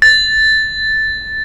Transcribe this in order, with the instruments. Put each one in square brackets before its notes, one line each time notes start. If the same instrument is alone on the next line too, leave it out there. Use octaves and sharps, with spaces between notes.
[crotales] A6